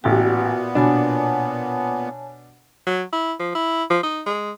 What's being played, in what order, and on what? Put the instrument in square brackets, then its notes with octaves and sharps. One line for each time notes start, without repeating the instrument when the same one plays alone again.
[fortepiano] A1 G4 [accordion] A#2 B3 [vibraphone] F#4
[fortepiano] B2 D4 [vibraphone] C#5 G#5 A5
[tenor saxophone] F#3
E4
F3
E4
F3
D#4
G#3